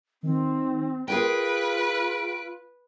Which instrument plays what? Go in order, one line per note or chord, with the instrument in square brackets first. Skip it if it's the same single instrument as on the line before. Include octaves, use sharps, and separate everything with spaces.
[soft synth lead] D#3 [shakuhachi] C4
[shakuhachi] F4 [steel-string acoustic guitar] G#4 A#4 G5 [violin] B4 [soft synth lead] D7